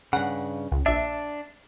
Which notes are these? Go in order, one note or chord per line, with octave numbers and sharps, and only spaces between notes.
G2 C#3 F#5
C#2
A#1 D4 E5